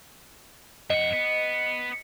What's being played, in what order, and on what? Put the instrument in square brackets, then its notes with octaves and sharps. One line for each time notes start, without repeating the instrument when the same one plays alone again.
[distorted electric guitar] F2 F#5 [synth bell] D#5
[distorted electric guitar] B3